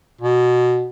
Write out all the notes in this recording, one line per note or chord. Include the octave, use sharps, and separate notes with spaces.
B2